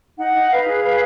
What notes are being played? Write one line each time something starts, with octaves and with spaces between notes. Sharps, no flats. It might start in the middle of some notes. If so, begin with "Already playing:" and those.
D#4 F#5
D#4
B4 F5
G#4
B4